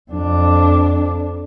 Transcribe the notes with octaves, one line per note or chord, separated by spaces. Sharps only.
F2 D4